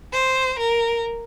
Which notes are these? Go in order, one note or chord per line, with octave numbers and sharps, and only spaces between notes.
C5
A#4